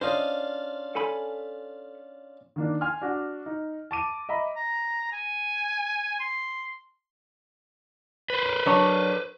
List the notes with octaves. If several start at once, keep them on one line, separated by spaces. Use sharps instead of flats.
C#4 D4 F4 C5 D#5
A4 G#5 B5
D#3 A#3 D4
G#5 C6 F6
D4 F#4
D#4
A5 D6 D#7
D#5 E5 A#5 B5
A#5
G#5
C6
B4 C5
F#3 D4 C#5